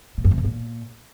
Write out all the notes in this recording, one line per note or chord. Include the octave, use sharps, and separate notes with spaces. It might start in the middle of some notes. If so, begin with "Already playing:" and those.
A#2
F#2
C3
F#2
A#2